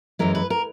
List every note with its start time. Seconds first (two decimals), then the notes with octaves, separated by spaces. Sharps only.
0.19 F#2 E3 G#3 A#4
0.35 B4
0.50 A#4